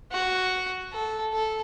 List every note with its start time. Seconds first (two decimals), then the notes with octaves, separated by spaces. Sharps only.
0.12 F#4
0.93 A4
1.33 A4